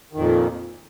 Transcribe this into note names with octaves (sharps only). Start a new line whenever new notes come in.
F2 A#2 D#3